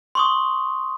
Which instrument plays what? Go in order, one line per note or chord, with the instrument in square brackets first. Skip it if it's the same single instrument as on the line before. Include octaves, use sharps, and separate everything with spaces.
[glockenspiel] C6 C#6 D#6